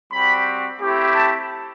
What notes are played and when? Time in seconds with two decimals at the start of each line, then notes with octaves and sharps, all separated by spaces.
0.12 G3 C4 F#4 B5
0.80 A3 C4 E4 G4
1.15 A5